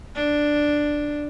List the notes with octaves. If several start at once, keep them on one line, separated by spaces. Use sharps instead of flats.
D4